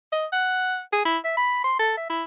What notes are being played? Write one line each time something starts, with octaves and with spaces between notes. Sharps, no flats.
D#5
F#5
G#4
E4
E5
B5
C6
A4
E5
E4